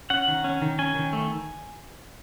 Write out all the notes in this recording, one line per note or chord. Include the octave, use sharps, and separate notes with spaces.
C#4 F#5
D#3
C#4
D#3
C#4 G#5
D#3
A3